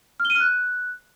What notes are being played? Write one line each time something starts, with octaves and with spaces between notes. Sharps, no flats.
F6
G7
D#7
F6
F#6